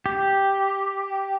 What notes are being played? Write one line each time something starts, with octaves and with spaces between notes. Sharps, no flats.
G4